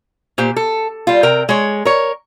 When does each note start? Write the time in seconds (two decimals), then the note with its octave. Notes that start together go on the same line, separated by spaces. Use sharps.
0.38 A#2 G4 C5
0.57 A4
1.07 G3 F4
1.23 C3 A#4 G5
1.49 G#3 C#5
1.85 A#4 C#5